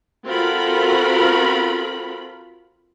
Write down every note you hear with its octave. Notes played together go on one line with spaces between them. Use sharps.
C4 F4 F#4 A4 A#4 B5